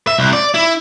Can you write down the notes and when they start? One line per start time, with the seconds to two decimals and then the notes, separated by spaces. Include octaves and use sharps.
0.07 E5
0.19 C2
0.33 D5
0.54 E4